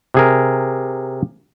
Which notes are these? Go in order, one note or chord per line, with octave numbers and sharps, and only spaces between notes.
C3 G#4 A#4